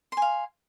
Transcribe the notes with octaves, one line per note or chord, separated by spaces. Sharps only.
F5 G#5 C6